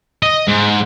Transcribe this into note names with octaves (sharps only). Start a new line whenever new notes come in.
D#5
G#2